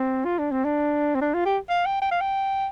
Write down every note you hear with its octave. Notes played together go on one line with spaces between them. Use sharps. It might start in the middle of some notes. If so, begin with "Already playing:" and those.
Already playing: C4
F4
D4
C4
D4
C4
D4
F4
G4
F5
G5
G5
F5
G5